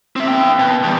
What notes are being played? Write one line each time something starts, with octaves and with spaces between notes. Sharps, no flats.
C4 E5
A#3 G5
B2
E2 G3